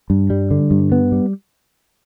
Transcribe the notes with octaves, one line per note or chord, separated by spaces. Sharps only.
G2
G3
D3
G2
B3
G3